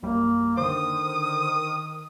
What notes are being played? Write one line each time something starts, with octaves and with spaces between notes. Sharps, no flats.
A#1 F#2 G3 A#3
D3 D#3 C5 D#6